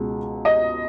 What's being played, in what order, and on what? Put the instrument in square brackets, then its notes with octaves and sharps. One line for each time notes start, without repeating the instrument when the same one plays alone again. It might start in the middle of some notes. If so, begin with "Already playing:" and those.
Already playing: [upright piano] C#2 B2 G#3
D#5